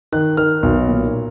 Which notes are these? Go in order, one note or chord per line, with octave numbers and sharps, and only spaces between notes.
D#3 F#6
D#3 F6
B1
A#2